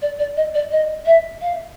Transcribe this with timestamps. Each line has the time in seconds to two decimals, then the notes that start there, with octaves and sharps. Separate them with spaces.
0.02 D5
0.19 D5
0.36 D#5
0.54 D5
0.71 D#5
1.06 E5
1.41 F5